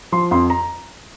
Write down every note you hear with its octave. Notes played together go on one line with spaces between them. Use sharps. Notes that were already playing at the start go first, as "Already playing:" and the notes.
F3 C6
F2 C6
A#5